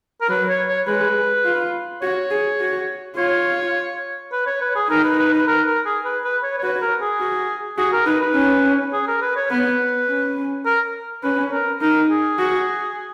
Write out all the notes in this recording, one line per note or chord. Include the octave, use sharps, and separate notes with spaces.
A#4
F#3 B4
C#5
C#5
G#3 B4
F4
F#4 C#5
G#4
F#4
F4 C#5
B4
C#5
B4
G#4
D#4 A#4
B4
B4
B4
A#4
A#4
G#4
B4
B4
C#5
C#5
F#4 B4
A#4
G#4
F#4
F#4 G#4
A#4
D#4 B4
B4
C#4
G#4
A#4
B4
C#5
B3 B4
C#4
A#4
C#4 B4
A#4
D#4 A#4
G#4
F#4